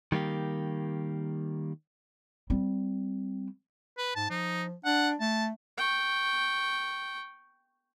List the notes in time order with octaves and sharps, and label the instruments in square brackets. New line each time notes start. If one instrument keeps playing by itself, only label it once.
[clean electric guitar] D#3 G3 A#3 G4
[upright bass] G3 C4
[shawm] B4
[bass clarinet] G#2 [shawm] A5
[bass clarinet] F3 [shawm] D#4
[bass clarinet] D4 [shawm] F#5
[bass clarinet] A3 [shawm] A5
[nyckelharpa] G5 C#6